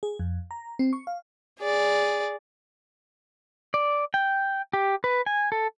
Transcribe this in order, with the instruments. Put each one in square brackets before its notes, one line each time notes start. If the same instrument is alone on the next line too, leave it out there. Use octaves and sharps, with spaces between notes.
[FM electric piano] G#4
F2
A#5
C4
C#6
F5
[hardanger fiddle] G#4 D5
[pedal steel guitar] D5
G5
G4
B4
G#5
A4